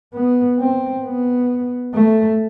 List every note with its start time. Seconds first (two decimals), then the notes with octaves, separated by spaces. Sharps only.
0.14 B3
0.59 C4
1.04 B3
1.94 A3